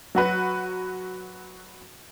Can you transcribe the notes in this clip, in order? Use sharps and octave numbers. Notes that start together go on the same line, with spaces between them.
F#3 F#4 B4